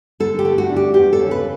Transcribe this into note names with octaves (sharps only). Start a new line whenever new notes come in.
D3 A4
G4
A3
F#4
D4
G4
E2 G4
A4
C#3
B4